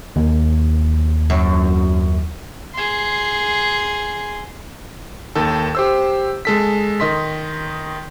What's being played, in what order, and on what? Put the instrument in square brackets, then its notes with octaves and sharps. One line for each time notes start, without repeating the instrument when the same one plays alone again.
[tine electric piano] D#2
[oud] F#2
[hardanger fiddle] G#4 C6
[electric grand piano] D#2 D#3 A4
G4 C5 E6
G#3 A4 B6
D#3 D#5 C6 B6